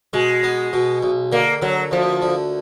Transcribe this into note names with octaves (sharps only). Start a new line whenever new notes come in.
B2 G#3
B3
B2
B1
D3 A#3
D3 F#3
D2 F3
D3